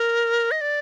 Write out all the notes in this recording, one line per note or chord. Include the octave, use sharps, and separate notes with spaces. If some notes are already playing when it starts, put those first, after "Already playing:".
Already playing: A#4
D#5
D5